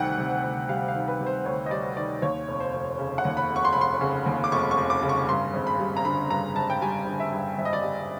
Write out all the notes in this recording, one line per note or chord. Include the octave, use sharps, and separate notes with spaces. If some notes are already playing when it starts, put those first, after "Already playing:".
Already playing: D2 C3 D#3 G3 F#5 G5
C3
D2
G3 F5
F5
D#3
B4
C3
C5
D2 C#5
D#5
G3 D5
D#3 D5
D#2 C#5
F1
C5
F1
C#3
F#5
D#2
B5
F1
C#6
C6
F1 B5
C6
C#3
D#2
D6
F1 C#6
C#6
F1
D6
C#3
C#6
G2 C6
G#1
B5
G3
A#5
D3 B5
G2 A#5
G#1 A5
G5
G3 G#5
D3
E5
G2
G#1 E5
D#5
D5
G3 D#5